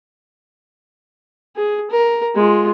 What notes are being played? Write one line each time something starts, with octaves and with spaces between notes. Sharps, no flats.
G#4
A#4
G#3 F4